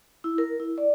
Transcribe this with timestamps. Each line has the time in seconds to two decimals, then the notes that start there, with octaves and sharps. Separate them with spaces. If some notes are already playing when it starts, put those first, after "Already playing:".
0.24 E4
0.38 A#4
0.60 E4
0.78 D5